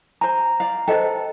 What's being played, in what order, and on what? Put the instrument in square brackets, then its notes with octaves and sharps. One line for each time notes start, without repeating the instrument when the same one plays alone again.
[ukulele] C5 G#5 [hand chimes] A#5
[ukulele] D5 F5
[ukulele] A4 B4 [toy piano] C5 D#5 G5